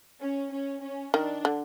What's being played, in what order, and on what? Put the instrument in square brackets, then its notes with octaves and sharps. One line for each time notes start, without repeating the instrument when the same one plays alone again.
[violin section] C#4
C#4
C#4
[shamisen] D#3 [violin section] D4
[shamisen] D3